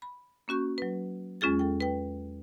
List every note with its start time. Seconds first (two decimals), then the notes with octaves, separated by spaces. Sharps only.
0.02 B5
0.48 A#3 C#4 F#4 C#6 G6
0.78 F#3 B4
1.41 E2 G#3 C#4 F4 G#4 A6
1.59 A4 G5
1.81 B4 G5